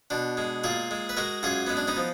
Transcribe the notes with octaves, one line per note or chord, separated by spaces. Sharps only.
B2 D4
G#3
A#2 F4 G#4
G#3
B4
G#3 F#4 A#4
F#2 F4 G#4
G#3 B3
D4
B3 D#4
F3